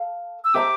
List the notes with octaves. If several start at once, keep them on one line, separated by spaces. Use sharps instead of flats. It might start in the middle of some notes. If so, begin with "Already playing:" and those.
Already playing: A4 F5
E6
G4 C5 E5 A#5 D6